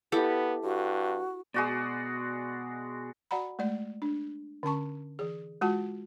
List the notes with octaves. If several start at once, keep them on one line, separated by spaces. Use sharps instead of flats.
B3 E4 G4 A4
G2 F#4
B2 G#3 F#4 D5
F#4 D5 F#5 A#5 B5
G#3 A3 D5
D4
D3 C#4 A5 C#6
E3 G#4
G#3 F4 F#4 F#5 A5